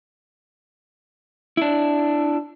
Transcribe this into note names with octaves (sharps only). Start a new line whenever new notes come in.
D4 E4